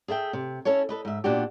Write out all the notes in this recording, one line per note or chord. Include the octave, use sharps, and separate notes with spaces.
G#4 A4 E5 G5
C3
C#4 E4 A4 C#5
A4 B4 D#5
G#2 E5
A#2 B3 D4 F#4 G4